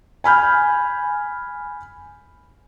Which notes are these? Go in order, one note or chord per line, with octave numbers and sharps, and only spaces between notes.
G#5 B5 F6 G6